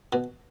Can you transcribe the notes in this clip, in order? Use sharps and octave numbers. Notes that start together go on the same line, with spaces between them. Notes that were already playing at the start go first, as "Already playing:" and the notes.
B2